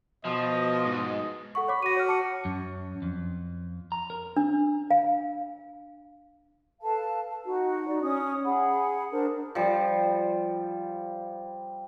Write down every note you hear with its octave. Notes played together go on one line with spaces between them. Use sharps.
B2 F3 D#5
G#2
A4 F#5 C#6
C#5 B5 D6
F#4 A#6 D#7
C#5 F6
A5 D6 C#7
F#2
F2
A#5
A#4
D4
F5
A4 B4 F5 A5
D#4 F#4
D#4 D5
C#4 D#6
G#4 F#5 B5
D4 A#4 C5
F3 G3